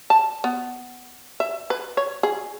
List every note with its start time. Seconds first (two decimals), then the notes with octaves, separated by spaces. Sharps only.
0.10 A5
0.44 B3
1.40 E5
1.70 B4
1.97 C#5
2.23 G#4